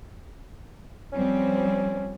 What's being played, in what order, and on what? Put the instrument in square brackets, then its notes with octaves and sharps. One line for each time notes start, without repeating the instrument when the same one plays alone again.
[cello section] F3 G3 C4 [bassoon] C#4